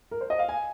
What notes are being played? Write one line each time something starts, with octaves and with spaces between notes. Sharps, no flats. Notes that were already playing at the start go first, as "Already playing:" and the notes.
A#4
C5
D#5
F5
G#5